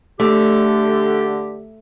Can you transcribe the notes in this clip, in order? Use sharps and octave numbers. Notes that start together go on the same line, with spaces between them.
D3 A3 G4